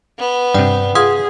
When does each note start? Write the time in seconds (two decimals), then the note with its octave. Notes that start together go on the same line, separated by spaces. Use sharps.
0.19 B3
0.54 G2 C3 D5 G5
0.95 F4 G#4 F#5 D#6 G#6